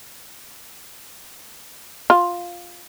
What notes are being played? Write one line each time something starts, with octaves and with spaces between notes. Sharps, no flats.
F4